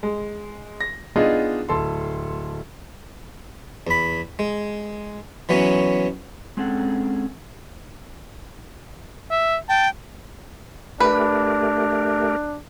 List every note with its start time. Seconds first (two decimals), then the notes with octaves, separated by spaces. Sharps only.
0.03 G#3
0.81 A#6
1.16 B3 D4 D#4 F4 G#4 D#5
1.69 D1 A4 C6
3.87 E2 B5
4.39 G#3
5.49 E3 F#3 B3 C#4
6.57 G#3 C4 C#4 G#4 A4 F#5
9.31 E5
9.69 G5 A5
11.00 A3 D4 G4 A#4 B4